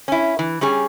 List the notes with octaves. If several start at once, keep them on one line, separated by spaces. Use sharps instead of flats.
C#4 E4
E3
G3 C#4 G#4